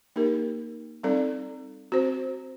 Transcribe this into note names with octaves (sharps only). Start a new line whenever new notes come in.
A#3 D#4 G4 A#4
G3 C4 D#4 A4 D5
C4 F#4 C5